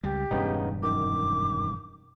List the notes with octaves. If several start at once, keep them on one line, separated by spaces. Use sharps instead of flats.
C#2 G3 G4
E1 G2 C#3 B3 D#4
F#2 D#3 D6